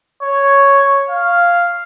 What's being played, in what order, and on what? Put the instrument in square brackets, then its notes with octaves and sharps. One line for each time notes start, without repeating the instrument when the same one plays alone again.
[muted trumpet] C#5
F5